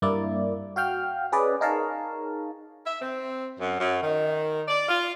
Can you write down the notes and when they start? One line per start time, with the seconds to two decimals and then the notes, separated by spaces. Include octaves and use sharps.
0.02 G2 A#3 E4 D5
0.76 F#4 F5 G5 F6
1.32 C#4 G#4 B4 D5 D#5
1.61 D#4 G#4 A#4 C#5 F5 A5
2.86 E5
3.02 C4
3.59 F#2
3.79 F#2
4.02 D#3
4.68 D5
4.88 F4